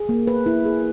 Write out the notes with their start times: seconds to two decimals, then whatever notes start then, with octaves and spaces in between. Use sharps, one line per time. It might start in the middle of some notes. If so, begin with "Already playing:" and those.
Already playing: G#4
0.09 A#3
0.27 B4
0.46 E4
0.65 G#4